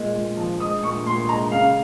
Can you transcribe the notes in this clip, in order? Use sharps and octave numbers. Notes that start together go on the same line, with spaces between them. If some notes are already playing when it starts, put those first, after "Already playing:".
Already playing: A#2 G#3
A#2
F3
G#3 D#6
A#2 C#6
A#2 C6
G#3 A#5
C#3 F5